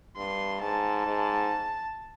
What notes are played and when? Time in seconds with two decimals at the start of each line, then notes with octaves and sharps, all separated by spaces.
0.17 G2 C6
0.62 G#2 A5
1.06 G#2